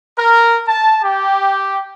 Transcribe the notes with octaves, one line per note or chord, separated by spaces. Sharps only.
A#4
A5
G4